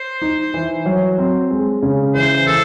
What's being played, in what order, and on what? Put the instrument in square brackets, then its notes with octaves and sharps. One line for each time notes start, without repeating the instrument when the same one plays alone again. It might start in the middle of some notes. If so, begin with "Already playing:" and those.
Already playing: [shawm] C5
[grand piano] D#4
E3
F#3
C4
G#3
C#3
[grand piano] E3 [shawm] C5
[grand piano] E3 [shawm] A4